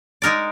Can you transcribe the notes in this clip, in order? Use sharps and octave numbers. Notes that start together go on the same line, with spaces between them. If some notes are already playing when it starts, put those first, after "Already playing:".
G#3 D#4 A#4 D5